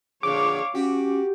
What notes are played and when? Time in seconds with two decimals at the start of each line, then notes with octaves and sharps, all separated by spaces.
0.23 A#2 D3 F3 G#4 C#5 F5 D6
0.75 C#4 F#4 G4